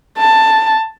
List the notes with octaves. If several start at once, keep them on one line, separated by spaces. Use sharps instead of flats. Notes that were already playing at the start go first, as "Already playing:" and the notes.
A5